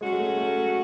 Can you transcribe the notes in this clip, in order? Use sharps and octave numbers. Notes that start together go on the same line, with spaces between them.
F#3 G#3 C#4 F#4
G#3
A3
A3